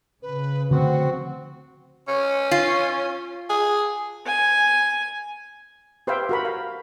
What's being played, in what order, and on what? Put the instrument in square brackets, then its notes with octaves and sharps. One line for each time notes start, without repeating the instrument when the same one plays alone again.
[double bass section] C#3 [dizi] B4
[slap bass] D3 F3 A3 [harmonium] C4 F#4 [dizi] F#5
[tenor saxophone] C#4
[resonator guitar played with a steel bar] F4
[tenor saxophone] G#4
[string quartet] G#5
[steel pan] G4 B4 C5 E5 F5 G5
F#4 A#4 B5
F5